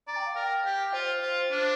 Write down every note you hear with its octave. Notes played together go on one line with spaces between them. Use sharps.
D5 A#5
G5
F5
A#4 G5
G4
F4 C5
F4
D4